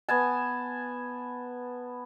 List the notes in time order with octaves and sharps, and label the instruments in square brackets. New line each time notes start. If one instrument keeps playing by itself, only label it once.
[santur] B3 G#5 A5